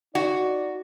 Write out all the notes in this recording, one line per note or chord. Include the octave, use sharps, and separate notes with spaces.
D#4 F#4 D5